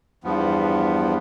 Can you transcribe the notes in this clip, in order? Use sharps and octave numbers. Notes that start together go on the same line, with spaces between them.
E2 G2 F3 B3